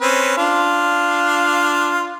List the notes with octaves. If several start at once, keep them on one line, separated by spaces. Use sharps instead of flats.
C4 C#4 B4
D4 F4 F5